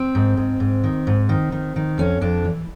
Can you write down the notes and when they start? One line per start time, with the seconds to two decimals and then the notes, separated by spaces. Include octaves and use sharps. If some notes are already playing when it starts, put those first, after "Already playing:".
Already playing: C4
0.15 G#2
0.37 G#2
0.60 G#2
0.84 D#3
1.07 G#2
1.29 D#3
1.52 D#3
1.76 D#3
1.98 F2 C#4
2.21 F2 D4
2.45 E3